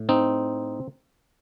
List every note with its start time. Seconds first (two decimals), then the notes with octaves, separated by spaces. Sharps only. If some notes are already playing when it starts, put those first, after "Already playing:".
Already playing: A2
0.09 C4 D#4